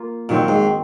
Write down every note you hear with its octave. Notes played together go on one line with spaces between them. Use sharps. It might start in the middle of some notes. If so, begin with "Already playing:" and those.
Already playing: A#3 F4
A#2 D#3 F#3 C4
G#2